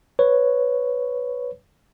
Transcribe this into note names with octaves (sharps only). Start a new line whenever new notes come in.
B4 C#5